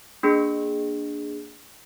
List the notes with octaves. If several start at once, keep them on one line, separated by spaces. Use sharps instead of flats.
A#3 D4 G#4